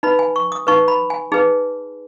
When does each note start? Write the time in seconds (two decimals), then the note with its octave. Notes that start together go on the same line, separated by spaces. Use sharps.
0.03 D#4 B4 B5
0.19 G#5
0.36 C#6
0.52 D#6
0.67 D#4 B4 C#6
0.88 B5
1.10 G#5
1.32 D#4 G#4 B4